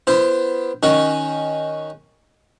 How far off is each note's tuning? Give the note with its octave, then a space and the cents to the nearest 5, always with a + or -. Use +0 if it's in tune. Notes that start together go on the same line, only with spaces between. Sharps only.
B3 +0 E4 +45 C5 -5
D#3 -5 C#4 +0 F#4 +0